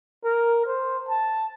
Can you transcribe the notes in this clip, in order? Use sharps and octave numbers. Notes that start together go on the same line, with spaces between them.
A#4
C5
A5